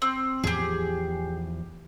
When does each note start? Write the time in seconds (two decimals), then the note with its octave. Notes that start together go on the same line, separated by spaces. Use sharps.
0.02 C4
0.44 E2 A2 F3 G4 G#4